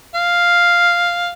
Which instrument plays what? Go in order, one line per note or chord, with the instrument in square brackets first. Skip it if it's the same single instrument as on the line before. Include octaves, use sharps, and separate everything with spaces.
[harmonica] F5